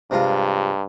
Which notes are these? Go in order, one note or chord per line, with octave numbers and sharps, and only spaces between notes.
G2 C3 G#3 F4